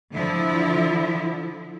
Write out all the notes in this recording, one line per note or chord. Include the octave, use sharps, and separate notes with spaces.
D3 F3 E4